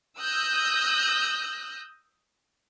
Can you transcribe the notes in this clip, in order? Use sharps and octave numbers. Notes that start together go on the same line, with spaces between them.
D#6 E6 F#6 G6 A#6